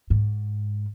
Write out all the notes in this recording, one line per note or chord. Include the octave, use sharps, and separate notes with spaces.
G#2